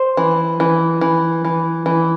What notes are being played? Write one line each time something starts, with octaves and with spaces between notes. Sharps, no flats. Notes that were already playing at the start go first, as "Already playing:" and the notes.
Already playing: C5
E3
E3
E3
E3
E3